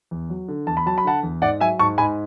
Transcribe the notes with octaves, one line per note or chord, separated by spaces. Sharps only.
E2
F#3
D3
E2 A5
B5
F#3 A5
B5
D3 F#5 A5
E2
G#2 D5 F#5
F#3 E5 G#5
G#2 A5 C#6
G#2 G#5 B5